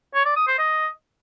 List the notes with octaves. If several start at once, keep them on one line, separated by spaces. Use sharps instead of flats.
C#5
D5
D#6
C5
D#5